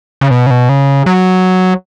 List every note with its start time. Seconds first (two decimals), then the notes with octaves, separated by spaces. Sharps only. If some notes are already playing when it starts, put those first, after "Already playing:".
0.21 C#3
0.31 B2
0.47 C#3
0.51 B2
0.69 C#3
1.06 F#3